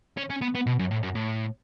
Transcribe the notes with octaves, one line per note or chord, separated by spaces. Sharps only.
C#4
C#4
B3
B3
B2
F#2
A2
F#2
A2